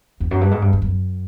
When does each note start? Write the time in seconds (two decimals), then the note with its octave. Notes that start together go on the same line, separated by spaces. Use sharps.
0.20 E2
0.31 F#2
0.41 G2
0.51 G#2
0.62 G2
0.73 G2
0.82 F#2